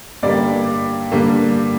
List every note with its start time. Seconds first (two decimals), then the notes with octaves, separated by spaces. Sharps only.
0.23 G2 D3 G3 A#3 D5
1.12 G2 D3 G3 A#3